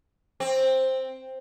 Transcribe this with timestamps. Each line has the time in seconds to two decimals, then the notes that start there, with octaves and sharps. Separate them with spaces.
0.40 C4